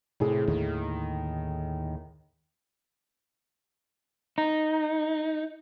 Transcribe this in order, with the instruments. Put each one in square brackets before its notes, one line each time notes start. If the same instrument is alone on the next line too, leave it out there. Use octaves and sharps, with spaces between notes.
[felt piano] A2 G#4 [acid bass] C3
[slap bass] D#2 D3 [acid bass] D#3
[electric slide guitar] D#4